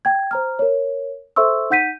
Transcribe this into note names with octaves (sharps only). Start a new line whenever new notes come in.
G5 G#6
C5 A#5 F6
A#4 C#5
A4 C5 E5 C6 C#6 E6
D#4 F#5 G6 B6 D#7